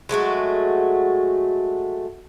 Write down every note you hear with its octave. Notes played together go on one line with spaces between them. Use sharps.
F#3 G#3 A3 F#4